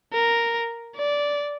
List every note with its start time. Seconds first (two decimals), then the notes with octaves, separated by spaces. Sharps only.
0.13 A#4
0.96 D5